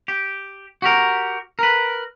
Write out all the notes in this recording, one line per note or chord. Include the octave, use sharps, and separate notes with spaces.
G4
F#4 G4 A#4
A#4 B4